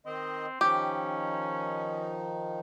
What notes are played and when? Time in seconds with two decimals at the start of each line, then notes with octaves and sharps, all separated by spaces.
0.06 D#3 C4 D#5
0.61 D#3 F3 C#4 D#4 G4